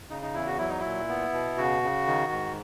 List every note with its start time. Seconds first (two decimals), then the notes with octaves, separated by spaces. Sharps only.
0.10 C#3 D#4
0.23 D#4
0.34 E2 E4
0.47 F#4
0.58 F#3 E4
0.69 D#4
0.80 A#2 E4
1.09 B3
1.33 B2
1.58 C#3 F#4
1.83 C#3
2.07 D#3
2.32 G#2